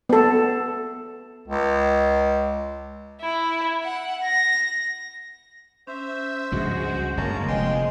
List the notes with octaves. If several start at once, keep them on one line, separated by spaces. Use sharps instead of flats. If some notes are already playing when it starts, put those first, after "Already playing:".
B3 A4
C#2
E4
F#5
A#6
C#4 C5 E5
C#2 G2 F3 G#3 F#4
G1 F#2 G#3 A#3 C#4 A5 A#5
F1 G#2 F3 G#3 D#5 G5 G#5 C6